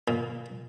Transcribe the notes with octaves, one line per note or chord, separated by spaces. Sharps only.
A#2